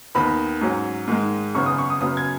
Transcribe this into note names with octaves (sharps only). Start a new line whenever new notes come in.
D#2 D#3 B3 B5
G#2 F#3 C#4
G#2 D#3 G#3
G#1 F#2 C#3 B3 C#6
D#6
C#6
D#6
F#2 C#3 F#3 B3 D#6
G#6